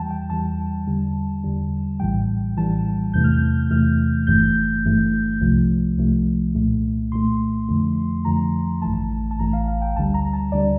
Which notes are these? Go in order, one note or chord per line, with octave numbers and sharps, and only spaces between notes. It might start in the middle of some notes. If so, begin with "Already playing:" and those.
Already playing: E2 E3 G3 G5 A5
G5
E2 E3 G3 A5
E2 D3 G3
E2 D3 G3
A#1 A2 E3 G3 G5
A#1 A2 E3 G3 A5
E2 C3 E3 A3 G6
F6
G6
E2 C3 E3 A3 F6
G1 G2 E3 A3 G6
G1 G2 E3 A3
C2 C3 F3 A3
C2 C3 F3 A3
C2 A#2 A3
C2 A#2 A3 C6
F2 D3 F3 A3
F2 D3 F3 A3 A#5
A1 G2 E3 A3 A5
A5
A1 G2 E3 A3 A#5
F5
F5
G5
D2 D3 G3 A5
A#5
A5
D2 D3 G3 D5